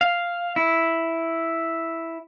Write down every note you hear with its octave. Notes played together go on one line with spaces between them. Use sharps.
F5
E4